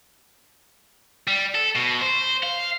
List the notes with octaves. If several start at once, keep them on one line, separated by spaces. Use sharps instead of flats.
G3
A4
B2
C5
F5